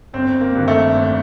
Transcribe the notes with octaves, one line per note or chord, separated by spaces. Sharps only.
G1 C4
A#3
G2 D#3
A3
G1